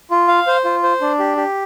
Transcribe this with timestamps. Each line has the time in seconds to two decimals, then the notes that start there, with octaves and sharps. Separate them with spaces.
0.11 F4
0.28 F5
0.47 C5
0.65 F4
0.83 C5
1.01 D4
1.19 G4
1.37 G4